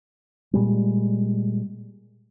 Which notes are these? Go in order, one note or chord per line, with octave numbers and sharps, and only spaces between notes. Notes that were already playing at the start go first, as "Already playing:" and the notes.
A#2 G3 G#3